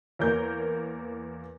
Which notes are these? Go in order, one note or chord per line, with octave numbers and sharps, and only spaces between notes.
E2 A#3 A#4 C#5 G6